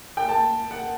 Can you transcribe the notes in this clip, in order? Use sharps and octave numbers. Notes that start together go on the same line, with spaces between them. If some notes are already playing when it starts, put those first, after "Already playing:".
G5
A5
F#5